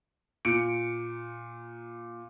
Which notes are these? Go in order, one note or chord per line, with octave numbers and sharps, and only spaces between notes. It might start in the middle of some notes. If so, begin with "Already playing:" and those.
A#2 C#7 D7